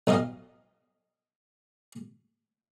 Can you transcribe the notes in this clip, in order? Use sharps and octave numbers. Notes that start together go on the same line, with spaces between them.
B1 D#4 D#5 F5